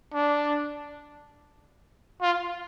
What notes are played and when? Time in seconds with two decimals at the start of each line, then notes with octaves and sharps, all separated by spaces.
0.13 D4
2.22 F4